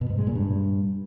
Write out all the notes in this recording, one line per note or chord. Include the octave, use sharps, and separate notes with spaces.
B2
G#2
G#3
A#2
G2